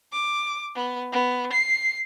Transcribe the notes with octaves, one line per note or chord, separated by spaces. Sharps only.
D6
B3
B3
C7